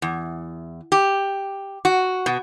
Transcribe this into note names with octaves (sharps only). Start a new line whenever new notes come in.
E2
G4
F#4
B2